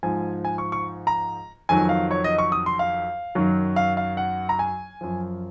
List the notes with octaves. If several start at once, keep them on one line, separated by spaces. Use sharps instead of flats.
G#2 F3 G#5
G#5
C#6
C#6
A#5
F2 D#3 F#3 G#5
F5
C#5
D#5
C#6
D#6
C6
F5
F#2 D#3 F#3
F5
F5
F#5
A#5
G#5
F#2 F3